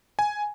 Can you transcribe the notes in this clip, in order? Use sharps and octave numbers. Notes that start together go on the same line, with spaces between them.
G#5